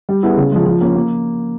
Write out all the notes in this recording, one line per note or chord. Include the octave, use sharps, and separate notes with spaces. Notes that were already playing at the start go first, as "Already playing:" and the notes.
G3
B3 E4 G#4
C#3
F3 G#3
F3
A#3 C#4
A#3